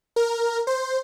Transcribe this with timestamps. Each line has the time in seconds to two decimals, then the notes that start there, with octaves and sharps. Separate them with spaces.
0.16 A#4
0.67 C5